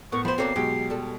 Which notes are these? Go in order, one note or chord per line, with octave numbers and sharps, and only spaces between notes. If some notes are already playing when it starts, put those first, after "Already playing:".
A2 B3 A#4 C#6
F3 C5 B5
D2 A#3 C4 F#4 A4 C#5 C7
B2 F#3 G#3 G4
G3 A4